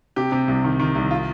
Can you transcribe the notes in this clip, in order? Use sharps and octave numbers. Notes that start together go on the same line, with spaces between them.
C3 G4
C3
C2
D#3
D#3
C2
F4